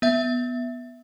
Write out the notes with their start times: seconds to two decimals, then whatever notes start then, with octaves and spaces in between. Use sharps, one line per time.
0.02 B3 E5